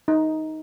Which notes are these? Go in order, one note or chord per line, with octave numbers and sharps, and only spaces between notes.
D#4